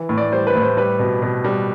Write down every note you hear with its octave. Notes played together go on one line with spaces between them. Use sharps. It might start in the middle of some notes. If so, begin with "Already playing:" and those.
Already playing: E3
A2
D5
G3 C5
B4
A2
C5
G3 B4
B2
B2
G3